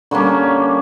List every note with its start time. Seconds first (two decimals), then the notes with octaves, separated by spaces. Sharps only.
0.11 D3 G3 A#3 C#4 C#6